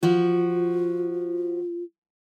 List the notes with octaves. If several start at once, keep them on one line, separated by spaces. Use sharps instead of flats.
F3 F4 F#4